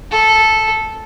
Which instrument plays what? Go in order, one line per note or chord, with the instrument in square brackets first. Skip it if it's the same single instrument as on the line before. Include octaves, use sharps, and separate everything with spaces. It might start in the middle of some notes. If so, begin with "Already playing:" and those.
[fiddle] A4